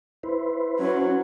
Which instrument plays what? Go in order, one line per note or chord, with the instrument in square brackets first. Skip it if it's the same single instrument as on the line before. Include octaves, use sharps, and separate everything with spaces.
[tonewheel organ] E4 B4 C5
[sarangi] F#3 [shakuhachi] C#4